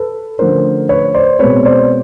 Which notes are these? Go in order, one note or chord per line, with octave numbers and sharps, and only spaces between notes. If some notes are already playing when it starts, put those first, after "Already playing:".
Already playing: A4 B4
D3 F3 A3 C#4 A#4 C5
B4 C#5
C5 D5
B2 G#3 C4 B4 C#5
C5 D5